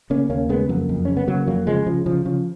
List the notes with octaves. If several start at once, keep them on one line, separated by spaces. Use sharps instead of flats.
C#3 A#3 C#4
D#2 A#3 C#4
C#3 G#3 B3
F2 F#3 A#3
F2
C#3 C#4
B3
C#3 F#3 A#3
F2 F#3 A#3
C#3 F3 G#3
C#3 F3
C#3 F3
C#3 F3